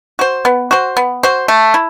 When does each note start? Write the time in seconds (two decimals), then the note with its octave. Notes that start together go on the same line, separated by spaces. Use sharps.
0.19 F#4 C5
0.45 B3
0.71 F#4 C5
0.97 B3
1.23 F#4 C5
1.48 A3
1.74 E4